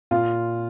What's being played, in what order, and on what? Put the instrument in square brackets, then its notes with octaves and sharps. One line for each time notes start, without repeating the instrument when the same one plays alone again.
[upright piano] A#2 F4